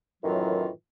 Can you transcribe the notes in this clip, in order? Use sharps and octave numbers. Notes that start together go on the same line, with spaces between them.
F#2 A2 D#3 E3 F#3 F4